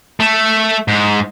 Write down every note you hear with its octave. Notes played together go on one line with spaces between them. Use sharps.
A3
G#2